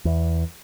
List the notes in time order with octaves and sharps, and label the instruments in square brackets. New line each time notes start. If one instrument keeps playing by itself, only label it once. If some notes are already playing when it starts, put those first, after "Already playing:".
[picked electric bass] E2